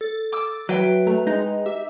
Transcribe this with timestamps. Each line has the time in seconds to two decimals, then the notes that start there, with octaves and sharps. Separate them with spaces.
0.01 A4 A6
0.32 D6 E6
0.69 F#3 B4 E5 G5
1.07 A3 A#5
1.27 G#3 D#4
1.66 G4 E5